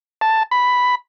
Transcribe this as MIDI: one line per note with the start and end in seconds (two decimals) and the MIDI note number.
0.21 0.43 81
0.51 0.95 83